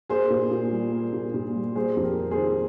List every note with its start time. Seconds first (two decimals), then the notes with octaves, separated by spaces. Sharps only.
0.10 A#3 G#4 C5
0.30 A#2
0.51 A#2
0.73 G3
0.92 A#3
1.13 A#2
1.34 A#2
1.56 G3
1.75 G3 G#4 C5
1.97 F2
2.03 G4 A#4
2.17 A#3
2.31 G#4 C5
2.37 D#3